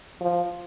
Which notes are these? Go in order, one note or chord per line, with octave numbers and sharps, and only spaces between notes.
F3